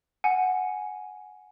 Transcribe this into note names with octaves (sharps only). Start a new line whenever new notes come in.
F#5 G#5